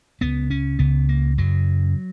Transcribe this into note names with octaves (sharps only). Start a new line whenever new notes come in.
C#2 C#3 B3
C#4
C#2 C#3 B3
A#3
F#2 C#3 F#3